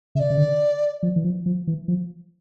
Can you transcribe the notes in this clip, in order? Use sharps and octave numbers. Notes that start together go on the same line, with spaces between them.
C#3 E5
D5
C#3
D3
F3
E3
F3
F3
E3
F3